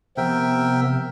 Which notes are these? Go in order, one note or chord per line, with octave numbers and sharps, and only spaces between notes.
C3 F3 B3 A#4 E5 G5